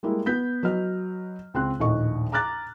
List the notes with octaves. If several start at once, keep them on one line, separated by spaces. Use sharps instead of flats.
G3 G#3 A#3 E4
B3 G6 B6
F#3 B4 D#5 F6
C#2 C4 C6 F#6
A#1 D#2 A2 D#5 C#6
A#5 D6 F6 F#6 A6